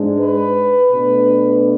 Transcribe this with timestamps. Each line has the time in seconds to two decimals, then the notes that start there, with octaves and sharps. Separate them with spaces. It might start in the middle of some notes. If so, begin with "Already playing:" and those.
Already playing: G#2 G#3 D4
0.19 B4
0.92 B2 A3 D4